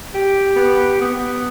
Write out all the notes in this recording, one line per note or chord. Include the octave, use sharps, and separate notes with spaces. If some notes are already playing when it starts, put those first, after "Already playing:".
G4
B3
B3